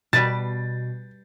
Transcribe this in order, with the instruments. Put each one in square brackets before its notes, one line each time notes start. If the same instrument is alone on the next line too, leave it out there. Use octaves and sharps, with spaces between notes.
[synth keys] B2 [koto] G3 B4 A5 [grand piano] A6